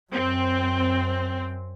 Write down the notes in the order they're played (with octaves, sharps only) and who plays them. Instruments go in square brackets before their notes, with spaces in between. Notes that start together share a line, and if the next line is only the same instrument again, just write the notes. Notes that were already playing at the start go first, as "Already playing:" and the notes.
[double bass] F#2 [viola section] C4